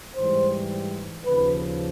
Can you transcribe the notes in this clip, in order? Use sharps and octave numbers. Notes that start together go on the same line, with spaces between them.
G#2 E3 G3 C5
D#2 C#3 F3 B4